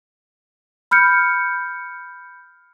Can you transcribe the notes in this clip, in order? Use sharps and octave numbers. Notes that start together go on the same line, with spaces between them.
B5 F6 G6 C#7